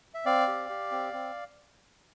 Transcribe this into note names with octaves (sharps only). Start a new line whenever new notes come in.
E5
C4 D5 F5
G4
G4
C4
C4